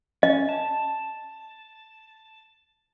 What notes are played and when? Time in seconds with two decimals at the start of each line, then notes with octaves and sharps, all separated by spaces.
0.23 C#4 D#5
0.49 A5